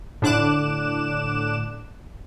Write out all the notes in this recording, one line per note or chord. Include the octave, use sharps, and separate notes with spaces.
A2 D3 D4 D6 F#6 E7